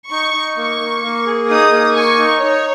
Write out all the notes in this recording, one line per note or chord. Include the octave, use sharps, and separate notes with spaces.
D#4 C#6
D#4
A#3 C#6
A#3
A#3
G#4
D#4 D#6
A#3
G#5 C#6
D#4
D#4 C#5